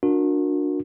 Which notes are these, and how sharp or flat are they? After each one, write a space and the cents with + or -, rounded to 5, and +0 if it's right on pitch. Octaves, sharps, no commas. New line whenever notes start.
D4 +0 F#4 -40 A#4 +0